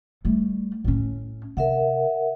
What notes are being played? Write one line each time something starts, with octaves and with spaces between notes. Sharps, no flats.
G3 A3
A2 C#4
C3 A#4 E5 F#5